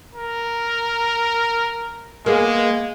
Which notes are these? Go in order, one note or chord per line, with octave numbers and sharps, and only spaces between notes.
A#4
G#3 A#3 B3 G#4